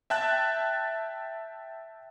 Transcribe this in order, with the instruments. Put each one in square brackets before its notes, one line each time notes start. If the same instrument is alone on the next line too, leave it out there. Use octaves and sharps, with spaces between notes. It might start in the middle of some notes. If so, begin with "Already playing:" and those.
[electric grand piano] E5 G5 A5 F#6 A6